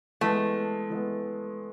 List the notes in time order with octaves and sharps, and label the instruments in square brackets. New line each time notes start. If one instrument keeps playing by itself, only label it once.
[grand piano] E3 G#3 B3 [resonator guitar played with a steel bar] A3
[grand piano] E3 G#3 B3